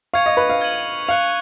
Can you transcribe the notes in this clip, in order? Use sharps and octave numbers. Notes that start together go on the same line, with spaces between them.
F5 C#6 G#6 C#7 F7
D#5
B4
F5
F6 G#6 D#7 F#7
F5 F#6 C#7 F7